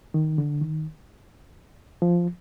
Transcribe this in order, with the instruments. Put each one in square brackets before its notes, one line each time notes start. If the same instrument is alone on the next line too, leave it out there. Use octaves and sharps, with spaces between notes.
[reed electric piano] D#3
D3
D#3
F3